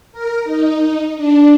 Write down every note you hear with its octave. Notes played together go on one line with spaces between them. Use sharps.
A#4
D#4
D4